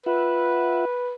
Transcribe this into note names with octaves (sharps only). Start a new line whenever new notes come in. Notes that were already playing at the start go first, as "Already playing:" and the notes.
F4 B4 E5 F#5